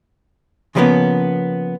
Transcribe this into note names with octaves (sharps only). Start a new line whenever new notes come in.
C#3 F3 G3 A#3 B3 C#4